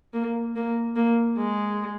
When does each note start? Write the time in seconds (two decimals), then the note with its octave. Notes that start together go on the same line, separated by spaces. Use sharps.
0.14 A#3
0.56 A#3
0.96 A#3
1.38 G#3